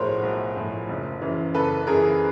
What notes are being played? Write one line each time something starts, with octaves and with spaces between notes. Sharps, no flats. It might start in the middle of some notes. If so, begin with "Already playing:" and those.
Already playing: B1 A2 F3 F#4 G#4 A#4 C5 C#5
B1
A2 F3
F#1
F#2 C#3 E3
F#1 A4 B4
F#2 C#3 E3 G#4 A#4